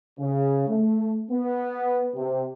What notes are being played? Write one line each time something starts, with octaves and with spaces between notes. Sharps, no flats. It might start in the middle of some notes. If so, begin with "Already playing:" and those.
C#3
A3
B3
C3